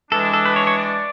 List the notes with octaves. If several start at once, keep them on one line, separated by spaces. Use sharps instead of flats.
E3 G#3 D4 A4
A4
B4
C#5
C#5
D5